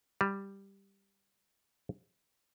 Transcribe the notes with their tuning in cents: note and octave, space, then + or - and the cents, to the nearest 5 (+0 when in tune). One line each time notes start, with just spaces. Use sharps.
G3 +5